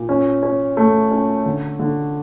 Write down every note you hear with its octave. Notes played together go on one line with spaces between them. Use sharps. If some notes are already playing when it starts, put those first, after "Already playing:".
Already playing: A#2
C#4
C#4
A3
C#4
D3
D3